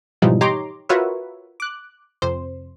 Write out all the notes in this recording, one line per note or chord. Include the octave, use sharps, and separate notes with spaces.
G#2 B2 E3 F3 G3 D#4
D#4 G4 C#5 A#5 C6 D6
F4 F#4 A#4 B4 C#5 E5
D6 F#6
F2 C3 C5